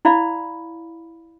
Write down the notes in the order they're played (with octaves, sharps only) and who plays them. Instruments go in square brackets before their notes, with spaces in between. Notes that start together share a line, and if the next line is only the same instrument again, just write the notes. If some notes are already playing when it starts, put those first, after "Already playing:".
[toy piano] E4 D5 F5 B5